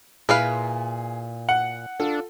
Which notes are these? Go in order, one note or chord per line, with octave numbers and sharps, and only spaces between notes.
A#2 E4 G#4 B4 F5
F#5 F#7
D4 F4 A4